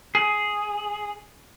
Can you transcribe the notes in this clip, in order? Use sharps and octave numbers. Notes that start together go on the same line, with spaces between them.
G#4